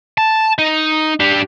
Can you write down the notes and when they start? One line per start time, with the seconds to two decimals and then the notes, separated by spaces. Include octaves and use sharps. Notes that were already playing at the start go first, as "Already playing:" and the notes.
0.18 A5
0.59 D#4
1.20 D4 G4